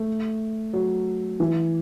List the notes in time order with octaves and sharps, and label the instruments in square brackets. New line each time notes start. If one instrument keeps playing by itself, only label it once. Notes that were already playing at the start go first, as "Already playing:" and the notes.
Already playing: [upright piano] A3
F#3
E3